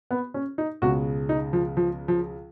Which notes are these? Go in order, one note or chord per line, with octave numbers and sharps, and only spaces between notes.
B3
C#4
D#4
C#2 B2 G#3 C#4 F#4
D#4
F3
F3
F3